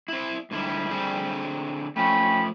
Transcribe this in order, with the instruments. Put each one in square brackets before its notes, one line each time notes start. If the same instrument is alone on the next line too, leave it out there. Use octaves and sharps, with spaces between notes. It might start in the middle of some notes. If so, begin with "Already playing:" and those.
[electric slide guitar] C4 E4
[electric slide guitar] G#2 D3 E4 [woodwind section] G3
[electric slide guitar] D3 C4 G#4
[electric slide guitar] F3 A3 [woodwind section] C#4 G5 B5